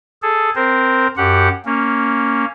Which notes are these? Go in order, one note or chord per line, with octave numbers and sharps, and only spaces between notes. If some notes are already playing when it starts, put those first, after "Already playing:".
G#4 A4
C4 A#4 C5
F#2 G4 F#5
A#3 C#4